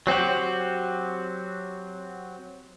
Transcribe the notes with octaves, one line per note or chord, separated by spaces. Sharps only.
F#3 C4 F#4 G4